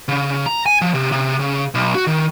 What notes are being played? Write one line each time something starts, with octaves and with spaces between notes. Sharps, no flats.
C#3
A#5
G#5
F3
C3
C3
C#3
B1
F#4
D#3